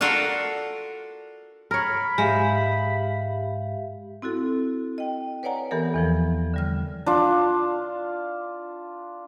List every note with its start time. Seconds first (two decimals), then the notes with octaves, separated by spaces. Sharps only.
0.01 D4 F4 F#4 A4 A#4
1.71 A#4 C#5 B5
2.18 G#2 G#3 G4 E5 F5
4.22 C4 E4 F#4 A4
4.98 D#5 G5
5.43 B4 C#5 D5 F#5 G#5 A#5
5.71 E3 B3 G4 A4 A#4
5.94 E2 E3 F3
6.54 D3 G3 F6
7.06 D4 F4